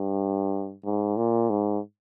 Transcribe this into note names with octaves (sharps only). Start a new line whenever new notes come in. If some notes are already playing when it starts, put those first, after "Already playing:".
Already playing: G2
G#2
A#2
G#2